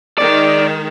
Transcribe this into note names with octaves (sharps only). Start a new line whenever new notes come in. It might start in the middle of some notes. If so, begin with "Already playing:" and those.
D#3 G#3 D5